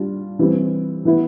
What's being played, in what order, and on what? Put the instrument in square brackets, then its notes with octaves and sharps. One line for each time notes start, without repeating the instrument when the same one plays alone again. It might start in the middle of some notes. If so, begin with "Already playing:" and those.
Already playing: [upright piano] G3 D4 F4
E3 G3 C4
E3 B3 E4